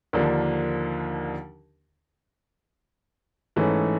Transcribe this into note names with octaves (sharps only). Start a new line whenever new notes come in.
D#2 D3 F3 A#3 D4
G#2 E3 A3 C#4